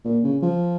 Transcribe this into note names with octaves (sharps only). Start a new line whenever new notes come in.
A#2
C#3
F3